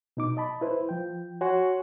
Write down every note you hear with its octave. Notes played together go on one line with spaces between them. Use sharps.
B2 D#4 D6
D#5 A5 B5
E4 B4 C5
F3 G5
F#4 C#5 G#5 C6